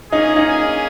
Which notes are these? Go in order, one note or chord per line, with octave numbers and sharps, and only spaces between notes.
A#3 C#4 D#4 G#4
D#4